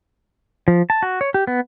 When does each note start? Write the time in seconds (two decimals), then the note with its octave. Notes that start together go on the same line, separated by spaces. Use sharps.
0.68 F3
0.90 A5
1.03 F#4
1.21 C#5
1.34 G4
1.47 B3